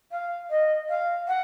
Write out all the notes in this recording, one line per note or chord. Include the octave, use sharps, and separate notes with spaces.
F5
D#5
F5
F#5